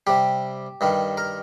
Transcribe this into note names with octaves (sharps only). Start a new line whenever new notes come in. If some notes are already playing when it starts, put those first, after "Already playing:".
C3 G3 G4
G2 D#3 G3
A#4